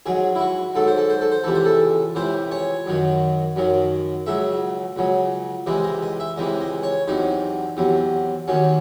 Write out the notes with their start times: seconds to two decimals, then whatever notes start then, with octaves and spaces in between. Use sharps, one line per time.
0.06 G#2 F#3 G#4
0.35 E4
0.40 F#4
0.75 G#2 F#3 A4
0.87 C5
0.98 A4
1.10 C5
1.21 A4
1.32 C5
1.44 C#2 C3 E3 A4
1.55 C5
1.65 A4
2.15 C#2 C3 E3 C5
2.52 C#5
2.86 F#2 D#3 F#3
3.56 F#2 D#3 F#3
4.26 C#2 C#3 F#3 E5
4.96 C#2 C#3 F#3
5.66 C#2 C3 E3 G#3 D#5
5.84 D#5
6.03 D#5
6.20 E5
6.36 C#2 C3 E3 G#3 D#5
6.61 D#5
6.83 C#5
7.07 E2 C3 F#3 D#4
7.77 E2 C3 F#3
8.48 D#2 D#3 F#3 C#4